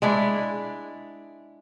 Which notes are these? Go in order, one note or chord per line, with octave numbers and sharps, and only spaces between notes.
G#3 D4 E4